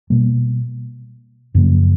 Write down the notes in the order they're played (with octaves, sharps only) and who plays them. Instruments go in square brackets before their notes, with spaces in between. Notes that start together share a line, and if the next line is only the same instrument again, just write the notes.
[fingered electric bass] B2 G3 A#3
F#2 C#3 F3 A#3